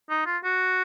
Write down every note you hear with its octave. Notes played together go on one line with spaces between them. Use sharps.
D#4
F4
F#4